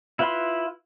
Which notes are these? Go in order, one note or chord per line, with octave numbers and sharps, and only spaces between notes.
E4 F4 B4 B5 C6